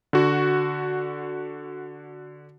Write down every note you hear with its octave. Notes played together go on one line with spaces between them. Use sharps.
D3 F#4